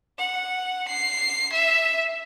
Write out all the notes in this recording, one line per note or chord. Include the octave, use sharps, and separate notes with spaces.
F#5
C7
E5